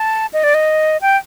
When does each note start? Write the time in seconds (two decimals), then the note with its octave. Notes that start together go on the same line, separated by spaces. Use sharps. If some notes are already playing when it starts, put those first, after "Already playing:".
Already playing: A5
0.33 D#5
0.44 D5
0.54 D#5
1.01 G5